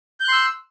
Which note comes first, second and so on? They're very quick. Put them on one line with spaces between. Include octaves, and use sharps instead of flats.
G6 F#6 C6 E6